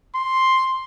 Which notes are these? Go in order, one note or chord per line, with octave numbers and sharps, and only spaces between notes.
C6